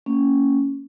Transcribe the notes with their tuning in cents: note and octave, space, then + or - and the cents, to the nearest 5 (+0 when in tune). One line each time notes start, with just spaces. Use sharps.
A#3 -25 C#4 +0